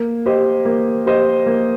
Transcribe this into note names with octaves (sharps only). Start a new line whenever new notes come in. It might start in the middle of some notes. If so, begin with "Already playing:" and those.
Already playing: A#3
G4 C5 D#5
A#3
G4 C5 D#5
A#3